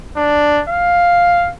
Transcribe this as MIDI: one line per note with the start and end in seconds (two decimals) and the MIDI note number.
0.17 0.60 62
0.69 1.51 77